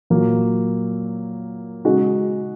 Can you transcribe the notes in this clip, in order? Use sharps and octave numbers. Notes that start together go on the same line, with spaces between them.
A#2 F#3 A#3
C#3 G#3 D#4 F#4